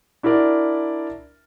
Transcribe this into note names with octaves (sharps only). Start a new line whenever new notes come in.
D4 E4 F#4 A#4 D5